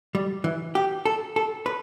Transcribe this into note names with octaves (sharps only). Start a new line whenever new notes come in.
G3
E3
G4
A4
A4
B4